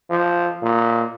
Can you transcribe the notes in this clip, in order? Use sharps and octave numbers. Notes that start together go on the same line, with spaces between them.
F3
A#2